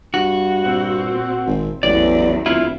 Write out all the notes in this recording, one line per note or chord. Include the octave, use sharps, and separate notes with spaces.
G2 F#4
A#2 C4
G#1
A1 E2 F#3 D5
D1 E4 F4